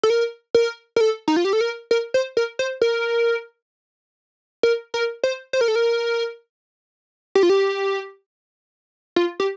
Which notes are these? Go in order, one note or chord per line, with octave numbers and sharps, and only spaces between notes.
A4
A#4
A#4
A#4
A4
D#4
F4
G4
A4
A#4
A#4
C5
A#4
C5
A#4
A#4
A#4
C5
C5
A#4
A4
A#4
G4
F4
G4
F4
G4